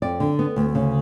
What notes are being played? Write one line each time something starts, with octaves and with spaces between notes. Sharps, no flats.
F2 D5
D3
B3
D2
C#3